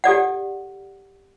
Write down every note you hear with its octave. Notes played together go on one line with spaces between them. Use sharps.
G4 A4 D5 F#5